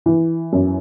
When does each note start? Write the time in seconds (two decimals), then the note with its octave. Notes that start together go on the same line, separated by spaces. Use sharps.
0.06 E3
0.53 F#2